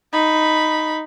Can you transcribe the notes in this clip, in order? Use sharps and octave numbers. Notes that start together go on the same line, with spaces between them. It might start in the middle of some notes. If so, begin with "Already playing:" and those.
D#4 B5